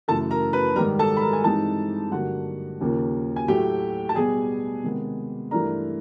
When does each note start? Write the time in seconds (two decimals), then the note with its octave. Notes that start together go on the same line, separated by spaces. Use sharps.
0.08 F#2 C#3 E3 A3 A4 A5
0.30 A#4 A#5
0.53 B4 B5
0.76 G#2 D#3 G3 A#4 A#5
0.99 A4 A5
1.17 B5
1.21 A#4 A#5
1.33 G#5
1.44 G2 E3 G#3 C4 D#4 A4 A5
2.11 G2 D3 F#3 A#3 F#4 F#5
2.81 D#2 C#3 F3 A#3
3.36 G#5
3.48 A2 F#3 A3 G4 G5
4.09 A5
4.15 B2 G3 B3 G#4 G#5
4.84 C3 D#3 G#3 B3
5.51 G2 E3 A3 D4 A#4 A#5